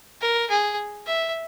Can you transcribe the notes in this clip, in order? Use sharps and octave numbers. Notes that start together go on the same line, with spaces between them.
A#4
G#4
E5